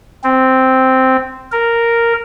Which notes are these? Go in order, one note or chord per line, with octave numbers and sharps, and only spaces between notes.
C4
A#4